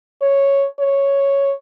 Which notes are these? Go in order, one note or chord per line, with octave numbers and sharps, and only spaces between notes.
C#5
C#5